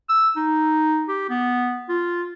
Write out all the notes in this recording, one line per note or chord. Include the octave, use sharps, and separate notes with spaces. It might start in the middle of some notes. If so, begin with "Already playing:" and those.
E6
D#4
G4
B3
F4